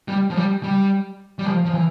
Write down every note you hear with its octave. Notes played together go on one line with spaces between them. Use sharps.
G3
F3
G3
G3
G3
F3
F3
E3